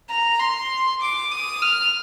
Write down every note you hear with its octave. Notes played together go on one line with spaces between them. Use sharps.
A#5
C6
D6
D#6
F6